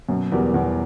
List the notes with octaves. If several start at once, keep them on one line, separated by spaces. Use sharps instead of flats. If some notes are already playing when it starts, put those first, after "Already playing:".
F#2 B2
E2 G3 B3 F#4 A#4
E2 B2